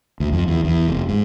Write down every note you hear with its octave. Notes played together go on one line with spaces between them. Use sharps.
D2
F2
E2
E2
F1
G#2